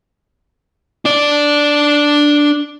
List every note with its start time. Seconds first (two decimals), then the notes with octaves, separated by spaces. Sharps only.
1.05 D4 D5